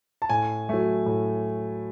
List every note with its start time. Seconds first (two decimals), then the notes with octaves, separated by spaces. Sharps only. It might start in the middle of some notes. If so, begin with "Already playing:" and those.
0.22 A5
0.30 A2 G#5
0.69 F#3 A3
1.06 A2